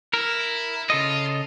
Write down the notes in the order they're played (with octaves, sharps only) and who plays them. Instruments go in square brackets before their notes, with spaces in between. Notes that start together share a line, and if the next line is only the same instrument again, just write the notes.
[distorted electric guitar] E4 [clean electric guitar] A#4
[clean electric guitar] C#3 A4 D#5 [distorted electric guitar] F4